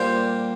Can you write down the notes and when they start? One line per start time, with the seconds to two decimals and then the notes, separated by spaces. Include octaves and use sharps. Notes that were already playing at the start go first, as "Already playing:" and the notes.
Already playing: A#2 G3 A#3 D4 C5